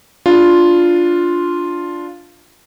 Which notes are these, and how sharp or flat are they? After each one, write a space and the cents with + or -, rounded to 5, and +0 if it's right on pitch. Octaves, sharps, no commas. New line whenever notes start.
D4 +0 F4 +0